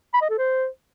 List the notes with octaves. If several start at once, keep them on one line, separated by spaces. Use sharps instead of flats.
B5
D#5
A4
C5